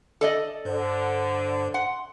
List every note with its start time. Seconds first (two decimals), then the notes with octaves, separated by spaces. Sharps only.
0.21 A4 D5 D#5
0.65 G2 D3 C5
1.74 F#5 C6